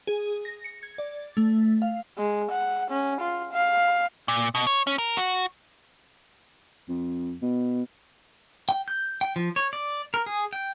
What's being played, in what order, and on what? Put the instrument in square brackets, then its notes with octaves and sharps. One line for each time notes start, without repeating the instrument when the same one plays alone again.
[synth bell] G#4
A#6
C#7
G#6
D5
A3
F5
[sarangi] G#3
F#5
C#4
F4
F5
[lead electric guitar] A#2
B2
C#5
C#4
A#4
F#4
[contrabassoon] F2
B2
[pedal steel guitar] G5
G6
G5
F3
C#5
D5
A#4
G#4
G5